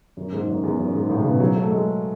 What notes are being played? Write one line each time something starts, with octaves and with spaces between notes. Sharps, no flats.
F#2
G#2
F#2
E2
F#2
G#2
A2
C#3
B2
F#3
A3
G#3